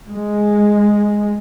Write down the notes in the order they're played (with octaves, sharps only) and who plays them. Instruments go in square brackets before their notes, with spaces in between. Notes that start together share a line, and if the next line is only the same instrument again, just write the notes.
[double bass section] G#3